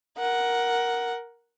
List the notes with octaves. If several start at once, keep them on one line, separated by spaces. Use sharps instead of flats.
A#4 F#5